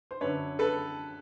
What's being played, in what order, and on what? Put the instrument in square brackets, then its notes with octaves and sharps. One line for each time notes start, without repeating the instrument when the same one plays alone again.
[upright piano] C5
F#2 D3 B4 C#5
A4 B4